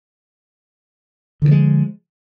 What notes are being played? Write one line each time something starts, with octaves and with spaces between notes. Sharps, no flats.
D3 D#3 F3 G#3